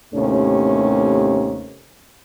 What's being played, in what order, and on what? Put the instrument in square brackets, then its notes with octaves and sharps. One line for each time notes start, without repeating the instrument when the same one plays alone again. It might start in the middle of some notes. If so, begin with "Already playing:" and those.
[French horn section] D#2 A2 C3 A3 C#4